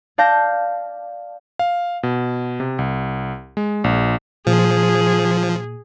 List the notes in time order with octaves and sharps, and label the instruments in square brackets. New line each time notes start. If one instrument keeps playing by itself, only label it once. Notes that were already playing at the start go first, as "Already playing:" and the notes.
[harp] D5 F5 A5 G6 A#6
[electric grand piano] F5
B2
C3
C2
G#3
A#1
[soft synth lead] A#2 [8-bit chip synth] F3 [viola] G#4